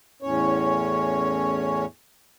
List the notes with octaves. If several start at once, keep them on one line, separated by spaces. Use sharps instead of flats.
E2 A2 C#4 C#5